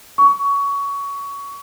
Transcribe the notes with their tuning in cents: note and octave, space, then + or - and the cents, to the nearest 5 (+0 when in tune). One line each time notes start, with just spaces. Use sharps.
C#6 +20